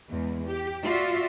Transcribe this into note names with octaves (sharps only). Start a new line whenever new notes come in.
E2 G#3
G4
F4 F#4 D5 E5 F5